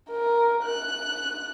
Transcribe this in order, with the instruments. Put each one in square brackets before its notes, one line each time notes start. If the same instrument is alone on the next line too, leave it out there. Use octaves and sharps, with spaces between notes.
[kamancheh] A#4
F#6